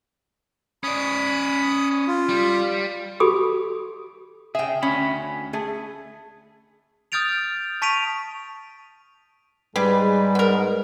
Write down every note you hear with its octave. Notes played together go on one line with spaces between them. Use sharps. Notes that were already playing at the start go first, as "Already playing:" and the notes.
C#4 D5 B5 D#6
F4
G3
F#4 G4 A4 B5 D6 D#6
C#3 G#4 E5 G5
D2 C#4 B5
A3 G#4
D#6 F6 G6 A6 D7 F7
A5 C#6 B6 D7 D#7 F7
G#2 G3 G#3 G4 G#4 B4
B3 A#4